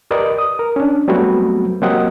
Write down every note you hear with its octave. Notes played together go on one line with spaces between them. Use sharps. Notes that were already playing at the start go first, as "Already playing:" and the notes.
G4 A#4 B4 D5 D#5
D#6
A#4
C#4 D4
F#3 G3 A3 B3 C4 F#4
F#3 A#3 C4 G4 D#5 F#5